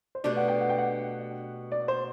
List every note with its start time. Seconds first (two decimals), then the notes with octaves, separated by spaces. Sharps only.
0.15 C5
0.24 B2 A3 D4 G4 D5
0.37 F#5
0.48 G5
0.61 F#5
0.69 G5
0.78 F#5
1.72 D5
1.88 C5